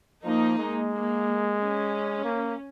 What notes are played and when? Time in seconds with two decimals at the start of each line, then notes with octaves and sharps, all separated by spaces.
0.24 F3 A#3 D#4
0.58 G#3
0.92 A#3
1.58 C#4
2.24 A#3